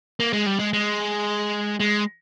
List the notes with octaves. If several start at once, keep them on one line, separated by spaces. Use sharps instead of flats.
A#3
G#3
G3
G#3
G#3
G#3